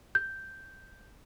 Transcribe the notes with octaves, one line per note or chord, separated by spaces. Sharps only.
G6